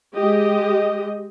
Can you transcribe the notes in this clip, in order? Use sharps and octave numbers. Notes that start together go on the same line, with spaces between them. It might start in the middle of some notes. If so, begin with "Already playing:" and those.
G#3 G4 D#5